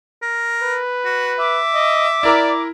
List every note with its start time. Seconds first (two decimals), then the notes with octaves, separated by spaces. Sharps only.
0.22 A#4
0.62 B4
1.05 F#4
1.39 E5 D6
1.75 D#5
2.23 E4 A#4 D5 A#5